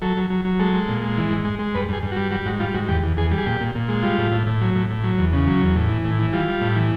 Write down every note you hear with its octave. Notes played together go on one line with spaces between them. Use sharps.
F#3 A4
F#3
F#3
F#3
G#3 A4
G#3
A#2
G#3
E3
G#2
G#3
G#3
G2 B4
G2 G#4
G2
F#4
G3
G3 F#4
G#2 F#4
G3 F4
G#2 F#4
E2 G4
E2
E2 G#4
G3
G#4
A#2 G4
A#2
A#2
G#3
G3 F4
A2
A2
A2
F#3
A2
A2
F#3
E2
C#3
F#3
E2
A2
E3
A2
E3
G3 F4
G3
A2
E3